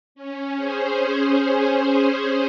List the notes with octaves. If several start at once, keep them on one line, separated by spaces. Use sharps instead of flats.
C#4
G#4 C5